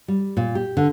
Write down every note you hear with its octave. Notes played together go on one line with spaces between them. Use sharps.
G3
A#2
G4
D3